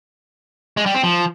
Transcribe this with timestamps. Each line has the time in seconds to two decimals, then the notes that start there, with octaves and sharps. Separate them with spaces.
0.77 G#3
0.86 G3
0.95 C4
1.03 F3